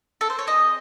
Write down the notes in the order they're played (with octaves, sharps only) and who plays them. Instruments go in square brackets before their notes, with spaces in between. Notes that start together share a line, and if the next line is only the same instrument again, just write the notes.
[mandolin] A4
C5
C#5
C4 E4 G#4 D#5